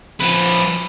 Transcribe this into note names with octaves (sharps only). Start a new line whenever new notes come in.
F3 B4